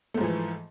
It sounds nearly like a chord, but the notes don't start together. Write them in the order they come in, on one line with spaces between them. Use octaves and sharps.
A3 G#2 F3 E3